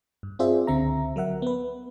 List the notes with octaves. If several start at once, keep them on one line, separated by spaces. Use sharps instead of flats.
G2
C4 F4 G#4 C5 D5 E5
C#2 D3 C4 E5 A#5
F#3 A#4 E5 F#5
B3 B4